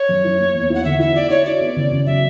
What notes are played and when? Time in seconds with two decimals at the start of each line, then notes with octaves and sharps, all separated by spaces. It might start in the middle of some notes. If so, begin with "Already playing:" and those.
Already playing: C#5
0.09 F#2
0.24 E4
0.40 A#3
0.54 E2
0.70 E4 F#5
0.84 D3 E5
0.99 E4 E5
1.16 E4 D5
1.30 E4 C#5
1.45 F#4 D5
1.61 B3
1.76 C#3
1.92 C#3
2.06 F#3 E5